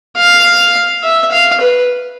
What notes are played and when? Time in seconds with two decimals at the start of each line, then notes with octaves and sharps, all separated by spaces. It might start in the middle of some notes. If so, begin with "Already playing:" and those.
0.17 F5
1.03 E5
1.32 F5
1.61 B4